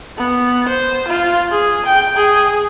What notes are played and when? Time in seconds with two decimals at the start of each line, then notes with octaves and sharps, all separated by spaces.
0.18 B3
0.69 C5
1.08 F4
1.51 G#4
1.86 G5
2.17 G#4